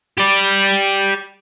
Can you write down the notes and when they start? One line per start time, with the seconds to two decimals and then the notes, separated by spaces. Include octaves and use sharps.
0.18 G4 D5